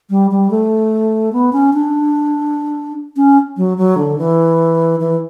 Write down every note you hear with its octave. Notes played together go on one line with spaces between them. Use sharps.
G3
G3
A3
B3
C#4
D4
C#4
F#3
F#3
D3
E3
E3